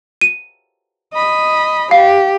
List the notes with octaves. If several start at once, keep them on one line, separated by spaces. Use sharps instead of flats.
D#7
D#5 B5
G4 F5